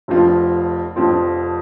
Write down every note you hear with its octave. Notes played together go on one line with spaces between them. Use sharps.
F1 F2 F3 C4 F4
F1 F2 F3 C4 F4